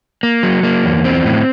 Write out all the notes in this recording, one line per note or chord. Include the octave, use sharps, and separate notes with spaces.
A#3
F#3
A#3
E2
C4
A2